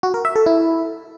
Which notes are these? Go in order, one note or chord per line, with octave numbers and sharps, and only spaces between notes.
F#4
A#4
E5
A4
E4